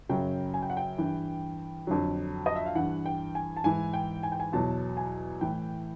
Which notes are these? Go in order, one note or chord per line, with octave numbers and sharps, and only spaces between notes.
F#2 C#3 F#3 G5
G#5
G5
F#5
G5
G2 E3
F2 D3 F#3
D#5
E5
F5
G2 E3 F#5
G5
G#5
A5
G#2 E3 G#5
G5
G#5
G5
G#5
E2 B2 F#3 A5
G#5
A2 E3 G5